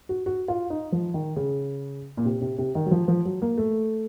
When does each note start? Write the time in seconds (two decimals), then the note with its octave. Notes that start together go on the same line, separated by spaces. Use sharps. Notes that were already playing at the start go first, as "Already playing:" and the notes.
0.09 F#4
0.26 F#4
0.48 F4
0.70 D#4
0.92 F3
1.14 D#3
1.36 C#3
2.17 A#2
2.25 C3
2.41 C3
2.58 C3
2.75 D#3
2.86 F#3
2.91 F3
3.08 F3
3.25 F#3
3.42 A#3
3.58 A3